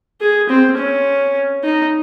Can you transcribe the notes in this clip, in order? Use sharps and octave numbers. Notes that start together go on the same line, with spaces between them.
G#4
C4
C#4
D#4